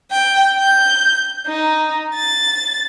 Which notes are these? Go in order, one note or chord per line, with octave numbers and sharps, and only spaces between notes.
G5
G6
D#4
A6